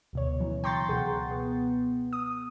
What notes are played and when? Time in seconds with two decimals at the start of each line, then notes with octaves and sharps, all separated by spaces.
0.13 D2 B2 C#5
0.40 C#3 E3 F#3
0.64 G5 A#5 C6 C#6 G6 A6
0.88 C#2 B2 G#4 F#5
1.31 B3
2.13 D#6